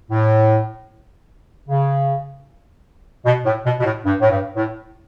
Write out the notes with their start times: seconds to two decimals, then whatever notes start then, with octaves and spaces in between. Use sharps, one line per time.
0.11 A2
1.68 C#3
3.25 B2
3.45 A2
3.65 B2
3.80 B2
3.84 A2
4.04 G2
4.20 A2
4.31 G2
4.56 A2